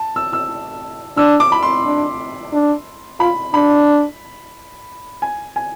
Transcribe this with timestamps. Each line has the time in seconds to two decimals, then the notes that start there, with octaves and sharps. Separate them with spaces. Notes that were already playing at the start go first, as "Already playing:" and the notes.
Already playing: A5
0.16 E6
0.33 E6
1.17 D4 E6
1.40 D6
1.52 B5
1.63 C6
1.85 D4
2.53 D4
3.20 F4 B5
3.54 D4 B5
5.22 G#5
5.56 G#5